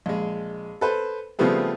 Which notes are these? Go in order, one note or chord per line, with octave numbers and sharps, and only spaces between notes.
A#1 G#3
A4 B4 C5
C#3 F3 G3 A3 B3 C4